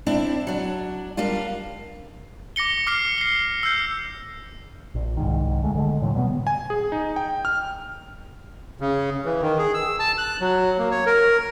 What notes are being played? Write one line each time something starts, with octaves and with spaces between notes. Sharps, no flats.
C4 D4 E4
F#3 D4
G3 A#3 D4 F4
D6 A#6 C#7 G7
D6 F6 C7 C#7
C7 G7
E6 F6 G6 C7
A#1
C2 G#2 D#3
D2 G#3 A3
D3 G#3 A3
A2 D3 F3 F#3
B2 G3 A#3 B3
G#5
G#4
D#4
G5
F6
C#3
E3
D#3
G#4
E6
A5
F#6
F#3
A#3
C#5
A#4